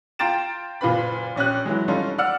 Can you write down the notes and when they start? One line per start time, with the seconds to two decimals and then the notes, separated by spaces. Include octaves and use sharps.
0.19 F4 G5 A#5 A6 D7 E7
0.81 F#1 A#2 F4 B4 B5
1.36 A#1 C#4 G4 F#6
1.65 E3 F#3 G#3
1.88 G3 C#4 D#4 F4 A4
2.18 D5 F#5 E6 F6 C#7